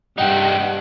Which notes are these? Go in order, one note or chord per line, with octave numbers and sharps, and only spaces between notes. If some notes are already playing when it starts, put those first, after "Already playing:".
G2 G3 D#4 F#5 G5